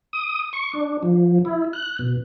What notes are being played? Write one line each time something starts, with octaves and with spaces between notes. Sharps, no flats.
D#6
C#6
D4
F3
E4
F#6
B2